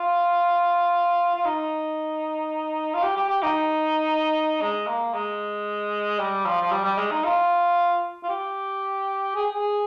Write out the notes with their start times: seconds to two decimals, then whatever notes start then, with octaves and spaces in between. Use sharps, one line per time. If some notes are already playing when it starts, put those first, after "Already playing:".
Already playing: F4
1.35 F4
1.45 D#4
2.94 F4
3.03 G4
3.16 G4
3.29 G4
3.43 D#4
4.61 G#3
4.87 A#3
5.14 G#3
6.19 G3
6.45 F3
6.61 F3
6.71 G3
6.84 G3
6.97 G#3
7.11 D#4
7.24 F4
8.23 F4
8.29 G4
9.35 G#4
9.54 G#4